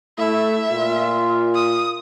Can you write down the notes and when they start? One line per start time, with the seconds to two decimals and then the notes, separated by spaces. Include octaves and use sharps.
0.18 A3 E4 E5
0.71 A#2 F4
1.54 D#6